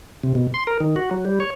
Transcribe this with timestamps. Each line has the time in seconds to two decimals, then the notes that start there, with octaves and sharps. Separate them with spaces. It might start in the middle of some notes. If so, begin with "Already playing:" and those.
0.23 C3
0.35 B2
0.54 C6
0.67 A#4
0.80 D#3
0.96 F#4
1.11 F#3
1.25 G3
1.40 C#5